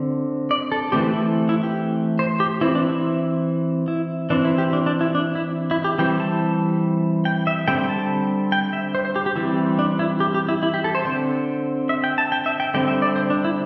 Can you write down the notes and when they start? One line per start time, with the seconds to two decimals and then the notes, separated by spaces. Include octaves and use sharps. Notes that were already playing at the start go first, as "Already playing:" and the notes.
Already playing: D3 C4
0.51 D5
0.72 A4
0.92 E3 A3 C4 G4
1.14 E4
1.49 E4
1.63 G4
2.19 C5
2.40 G4
2.61 E3 C4 E4
2.75 D4
2.89 E4
3.88 E4
4.30 E3 C4 D4
4.45 E4
4.58 G4
4.73 D4
4.86 D4
5.01 E4
5.15 D4
5.35 E4
5.71 E4
5.84 G4
5.98 E3 G3 C4 G5
6.20 A5
7.25 G5
7.47 E5
7.68 D3 G3 C4 G5
7.89 A5
8.52 G5
8.73 E5
8.95 C5
9.05 C5
9.16 G4
9.26 G4
9.36 E3 G3 C4 E4
9.79 D4
9.99 E4
10.20 G4
10.34 G4
10.49 E4
10.63 E4
10.74 G4
10.84 A4
10.95 C5
11.05 D3 C4 C5
11.89 E5
12.04 G5
12.18 A5
12.32 G5
12.46 E5
12.60 G5
12.74 D3 G3 C4 G5
12.88 E5
13.02 D5
13.16 C5
13.30 D4
13.44 E4